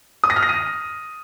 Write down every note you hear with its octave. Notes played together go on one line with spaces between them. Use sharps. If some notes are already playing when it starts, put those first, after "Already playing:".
D#6
A#6
F6
A#6
D#7